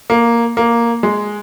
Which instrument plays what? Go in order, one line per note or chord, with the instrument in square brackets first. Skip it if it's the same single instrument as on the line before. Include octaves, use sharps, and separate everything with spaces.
[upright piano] A#3
A#3
G#3